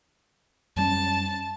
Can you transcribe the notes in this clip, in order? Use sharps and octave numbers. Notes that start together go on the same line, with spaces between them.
F#2 G3 C#4 A5